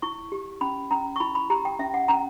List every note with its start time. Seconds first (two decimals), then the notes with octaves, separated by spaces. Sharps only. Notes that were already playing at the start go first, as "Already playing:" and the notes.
0.02 E4 C#6
0.32 G4
0.61 C#4 B5
0.91 C#4 A#5
1.16 C#6
1.20 E4 B5
1.35 B5
1.50 G4 A#5
1.65 G5
1.79 C#4 E5
1.94 F#5
2.08 C#4 A#5